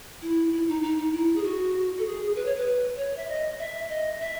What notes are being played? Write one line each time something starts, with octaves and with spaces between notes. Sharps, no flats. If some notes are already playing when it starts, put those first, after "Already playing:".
E4
E4
D#4
D#4
D#4
E4
G#4
F#4
A4
G#4
B4
C#5
B4
C#5
E5
D#5
E5
D#5
E5